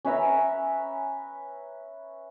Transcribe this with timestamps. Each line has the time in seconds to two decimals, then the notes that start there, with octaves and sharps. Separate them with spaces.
0.05 C#4 B4 E5 A#5